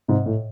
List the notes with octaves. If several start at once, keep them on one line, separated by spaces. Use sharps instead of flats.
G#2 C3
A2